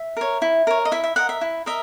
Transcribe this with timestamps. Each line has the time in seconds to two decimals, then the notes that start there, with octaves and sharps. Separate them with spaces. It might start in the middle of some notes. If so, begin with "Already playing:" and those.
Already playing: E5
0.17 A#4 C#5
0.42 E4
0.67 A#4 C#5
0.85 D#5
0.92 E4 E5
1.04 E5
1.16 A#4 D#5 F#5
1.29 E5
1.41 E4
1.66 A#4 D#5 E5